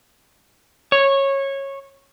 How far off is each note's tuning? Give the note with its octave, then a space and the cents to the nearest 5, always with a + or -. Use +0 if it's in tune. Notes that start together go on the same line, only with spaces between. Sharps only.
C#5 -15